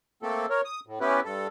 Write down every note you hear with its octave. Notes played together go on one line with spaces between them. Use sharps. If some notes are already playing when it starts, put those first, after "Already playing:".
A3 A#3 C4 A4
A#4 C#5
D#6
A2
B3 C#4 E4 G4 B4
G2 A4